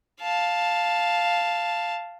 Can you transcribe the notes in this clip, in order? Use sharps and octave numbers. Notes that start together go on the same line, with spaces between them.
F5 A5